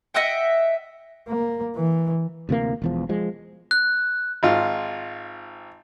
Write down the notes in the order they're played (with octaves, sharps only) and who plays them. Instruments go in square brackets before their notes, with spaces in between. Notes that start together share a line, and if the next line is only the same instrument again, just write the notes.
[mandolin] D#5 E5 F#5 G5
[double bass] A#3
E3
[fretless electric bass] D2 C3 E3 A#3
E1 E2 F3
F3 G#3
[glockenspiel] F#6
[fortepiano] G#1 F4